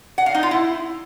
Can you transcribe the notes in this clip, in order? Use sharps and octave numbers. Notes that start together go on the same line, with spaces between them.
F#5
F5
D#4
F4
E4